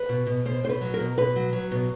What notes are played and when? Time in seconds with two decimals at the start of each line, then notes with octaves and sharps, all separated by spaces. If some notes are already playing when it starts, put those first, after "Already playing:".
Already playing: B4
0.09 B2
0.27 B2
0.45 B2 C5
0.63 B2 C5
0.69 B4
0.81 F#3
0.94 A#4
1.00 B2
1.17 B2 B4
1.36 F#3
1.53 F#3
1.71 B2